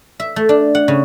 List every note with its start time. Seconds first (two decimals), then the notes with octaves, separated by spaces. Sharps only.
0.20 E5
0.36 A3
0.49 D4
0.75 F#5
0.88 C#3